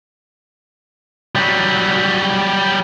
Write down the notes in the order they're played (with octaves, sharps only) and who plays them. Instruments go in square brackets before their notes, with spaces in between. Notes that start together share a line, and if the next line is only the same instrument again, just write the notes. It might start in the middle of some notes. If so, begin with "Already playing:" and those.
[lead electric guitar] F#3 G3